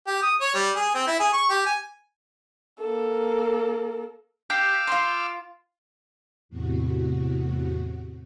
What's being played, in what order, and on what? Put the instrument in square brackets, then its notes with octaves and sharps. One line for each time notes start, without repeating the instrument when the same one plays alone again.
[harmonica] G4
D#6
C#5
G3
G#4
C4
E4
G#4
C#6
G4
G#5
[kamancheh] A#3 A4
[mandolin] G4 [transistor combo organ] F5 D6 E6 [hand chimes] G6 C7
[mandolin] F4 C6
[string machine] E2 A2 C3 F#4